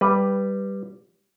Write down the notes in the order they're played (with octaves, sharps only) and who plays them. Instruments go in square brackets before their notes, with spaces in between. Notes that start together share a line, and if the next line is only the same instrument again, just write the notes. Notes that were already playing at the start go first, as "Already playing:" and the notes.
[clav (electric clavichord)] G3 B4